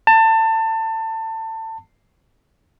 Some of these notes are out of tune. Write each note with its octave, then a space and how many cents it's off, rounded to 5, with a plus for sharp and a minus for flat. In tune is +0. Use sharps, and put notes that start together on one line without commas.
A5 +25